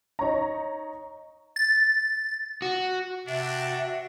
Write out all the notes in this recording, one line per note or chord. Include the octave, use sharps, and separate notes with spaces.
D#4 C#5 A#5
A6
F#4
C3 D4 F#4 E5